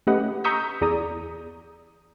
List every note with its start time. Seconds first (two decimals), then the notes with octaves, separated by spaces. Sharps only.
0.07 A3 C#4 G4 B4 D#5 F#5
0.44 A#5 C#6 D#6 E6 G6 B6
0.81 E2 G#4 D5 A#5 D#6